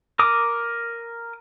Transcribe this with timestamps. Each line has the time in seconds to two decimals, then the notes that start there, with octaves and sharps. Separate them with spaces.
0.19 A#4 D6 D#6